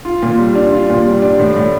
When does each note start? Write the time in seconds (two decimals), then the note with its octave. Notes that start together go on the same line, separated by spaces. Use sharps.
0.05 F4
0.23 A#2
0.39 G3
0.55 D4
0.73 F4
0.90 A#2
1.06 G3
1.22 D4
1.39 A2
1.56 A2